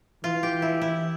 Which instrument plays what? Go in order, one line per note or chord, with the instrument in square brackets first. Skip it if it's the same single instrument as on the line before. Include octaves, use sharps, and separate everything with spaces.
[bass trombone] E3 [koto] F4
[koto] G4
E4
E4